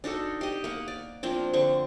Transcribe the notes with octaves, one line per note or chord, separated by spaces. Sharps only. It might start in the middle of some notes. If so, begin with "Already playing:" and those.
D4 D#4 F#4 A4
G4 D#5
A#3 F#5
D5
F3 A#3 C4 D4
D3 C4 C#6